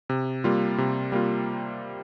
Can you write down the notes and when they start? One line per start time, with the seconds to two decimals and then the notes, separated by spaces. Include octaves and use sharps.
0.09 C3
0.44 G3 A#3 F4
0.78 C3
1.12 G3 A#3 F4